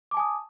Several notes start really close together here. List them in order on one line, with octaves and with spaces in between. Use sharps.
D6 A5 G#5 D#6